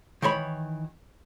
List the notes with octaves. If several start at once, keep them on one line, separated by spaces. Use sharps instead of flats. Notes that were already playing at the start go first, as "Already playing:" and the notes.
D#3 E3 C#5 B5